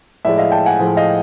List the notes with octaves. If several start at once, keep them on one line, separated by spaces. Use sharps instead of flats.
A2 F3 G#3 D5 E5
D#5 F5
G5 A5
F#5 G#5
A2 F3 G#3
D#5 F5